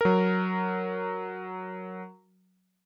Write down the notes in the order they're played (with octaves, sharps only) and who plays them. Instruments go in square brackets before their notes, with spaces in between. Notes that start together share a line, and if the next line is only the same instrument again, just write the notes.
[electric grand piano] F#3 A#4